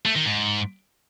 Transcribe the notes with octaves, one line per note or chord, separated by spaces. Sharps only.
A3
D#3
G#2